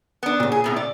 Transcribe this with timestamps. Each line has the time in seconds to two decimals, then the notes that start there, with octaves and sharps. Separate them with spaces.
0.23 B3 D4
0.40 A#2 C#3
0.52 G#4
0.64 A2 C3 B3
0.76 D5